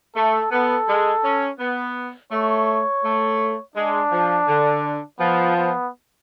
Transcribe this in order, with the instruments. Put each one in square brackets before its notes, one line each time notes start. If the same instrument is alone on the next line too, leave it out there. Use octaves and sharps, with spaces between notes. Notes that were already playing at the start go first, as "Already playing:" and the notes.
[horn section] A3 [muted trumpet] A4
[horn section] B3 [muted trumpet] A4
[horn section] G#3
C#4
B3
[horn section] A3 [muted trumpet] C#5
[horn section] A3
[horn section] G#3 [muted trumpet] D4
[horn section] F3
D3
[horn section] F3 [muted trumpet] B3
[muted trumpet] B3